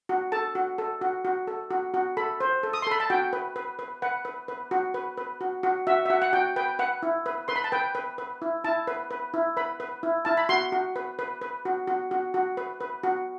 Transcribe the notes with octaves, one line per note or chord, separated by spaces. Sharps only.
F#4
A4 A5
F#4
A4
F#4
F#4
A4
F#4
F#4
A4 B5
C5
A4
D#6
C6
A4 B5
A5
F#4 G5
B4
B4
B4
B4 F#5
B4
B4
F#4
B4
B4
F#4
F#4
F#4 E5
E5
F#4 F#5
F#5
F#4 G5
B4 G5
B4 F#5
E4
B4
B4 C6
B5
A5
B4 G5
B4
B4
E4
E4 A5
B4
B4
E4
B4 B5
B4
E4
E4 A5
B5
F#4 C6
F#4
B4
B4
B4
F#4
F#4
F#4
F#4
B4
B4
F#4